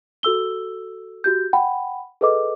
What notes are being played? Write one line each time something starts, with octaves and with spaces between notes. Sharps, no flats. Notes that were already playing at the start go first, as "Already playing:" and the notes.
F#4 A4 E6 G7
F#4 G4 G6
F#5 G5 B5
G#4 A4 B4 D#5 D6